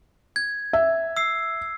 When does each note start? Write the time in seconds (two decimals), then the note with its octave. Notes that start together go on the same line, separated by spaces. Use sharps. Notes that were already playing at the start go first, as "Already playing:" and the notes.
0.36 G#6
0.73 E5
1.17 E6 C7